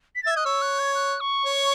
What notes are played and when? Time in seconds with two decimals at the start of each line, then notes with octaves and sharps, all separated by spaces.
0.16 B6
0.23 A6
0.27 E5
0.31 G#6
0.36 D#5 F#6
0.45 C#5 E6
0.62 F#6
0.79 G#6
0.95 F#6
1.20 C#6
1.46 C#5